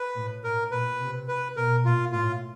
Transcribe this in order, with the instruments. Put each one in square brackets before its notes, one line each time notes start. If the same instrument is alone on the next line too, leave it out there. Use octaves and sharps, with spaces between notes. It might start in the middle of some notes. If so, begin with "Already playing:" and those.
Already playing: [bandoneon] B4
[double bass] A2
[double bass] A2 [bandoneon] A#4
[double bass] A#2 [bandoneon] B4
[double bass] C3
[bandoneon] B4
[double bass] B2 [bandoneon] A#4
[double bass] A#2 [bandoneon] F4
[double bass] A2 [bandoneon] F4